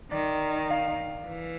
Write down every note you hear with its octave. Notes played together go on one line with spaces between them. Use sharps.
D#3 D5
F5
E3